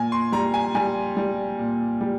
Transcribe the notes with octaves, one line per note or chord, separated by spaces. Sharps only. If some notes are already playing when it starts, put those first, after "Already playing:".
Already playing: A#2 G#5
C6
G3 A#5
G#5
G3 G#5
G3
A#2
G3